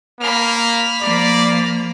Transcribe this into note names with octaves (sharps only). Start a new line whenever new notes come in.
A#3 B5 F6
F3 A#3 D5